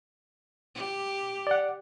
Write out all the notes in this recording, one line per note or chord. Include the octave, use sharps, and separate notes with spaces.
G4
D5 F#5